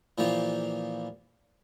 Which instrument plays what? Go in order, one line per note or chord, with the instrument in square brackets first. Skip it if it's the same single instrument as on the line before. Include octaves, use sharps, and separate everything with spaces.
[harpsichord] A#2 E3 F3 A#3 G4